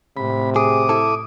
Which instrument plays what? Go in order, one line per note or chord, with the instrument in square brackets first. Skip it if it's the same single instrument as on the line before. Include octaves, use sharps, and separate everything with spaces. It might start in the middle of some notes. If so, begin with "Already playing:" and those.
[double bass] A2 [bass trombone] C3 [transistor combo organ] B5
[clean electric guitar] G#4 [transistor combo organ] D6 D#6
[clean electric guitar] E4 A4